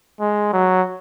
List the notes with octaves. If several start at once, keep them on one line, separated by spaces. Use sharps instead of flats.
G#3
F#3